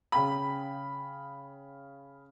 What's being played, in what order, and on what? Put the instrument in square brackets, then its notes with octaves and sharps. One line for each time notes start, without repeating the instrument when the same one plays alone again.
[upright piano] C#3 G5 B5